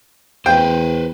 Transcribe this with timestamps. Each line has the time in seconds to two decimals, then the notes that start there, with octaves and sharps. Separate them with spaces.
0.46 E2 B4 C5 G5